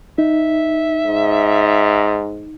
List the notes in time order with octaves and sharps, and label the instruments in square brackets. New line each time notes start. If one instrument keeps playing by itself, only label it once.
[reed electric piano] D#4 [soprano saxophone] E5
[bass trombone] G#2